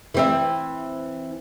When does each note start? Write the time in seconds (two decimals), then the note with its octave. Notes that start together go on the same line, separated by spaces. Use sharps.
0.14 E3 C4 E4